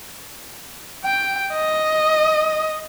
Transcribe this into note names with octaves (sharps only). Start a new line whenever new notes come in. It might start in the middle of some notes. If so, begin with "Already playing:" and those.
G5
D#5